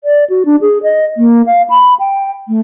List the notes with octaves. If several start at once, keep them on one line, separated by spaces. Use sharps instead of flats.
D5
F#4
D4
G#4
D#5
A#3
F5
B5
G5
A3